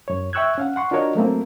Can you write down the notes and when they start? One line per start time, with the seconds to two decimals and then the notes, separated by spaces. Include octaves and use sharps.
0.08 F#2 C#5
0.33 E5 G5 C#6 E6 F#6 G#6
0.58 C#4 F5 F#5
0.76 F#5 C6 C#6
0.91 D4 F4 F#4 A#4 C#5 D#5
1.15 F#3 A3 A#3 C4